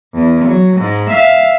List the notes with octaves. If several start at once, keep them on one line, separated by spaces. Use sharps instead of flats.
E2
F#3
G#2
E5 F5